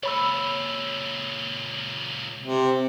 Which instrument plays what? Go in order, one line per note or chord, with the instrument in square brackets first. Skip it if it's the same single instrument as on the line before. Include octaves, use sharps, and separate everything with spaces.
[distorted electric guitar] C#2 A#2 [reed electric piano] C#5 B5 E6
[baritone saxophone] C3